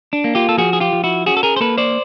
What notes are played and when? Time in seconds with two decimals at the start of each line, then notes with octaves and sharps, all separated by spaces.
0.13 D4
0.24 A#3
0.35 F4 G4
0.49 A4
0.58 F3 F#4 G#4
0.73 G#4
0.80 F4 G4
0.93 F3
1.04 E4 F#4
1.26 C#4 F#4 G#4
1.37 A4
1.43 G#4 A#4
1.56 C5
1.61 A#3 A4 B4
1.78 C5 D5